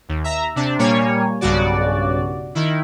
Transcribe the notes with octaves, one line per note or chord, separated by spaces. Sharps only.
D#2
E5 A#5
C3 D4
A#2 G3 A#3 C#5 G#5
B1 G2 C#3 F#4 D5
D#3 E4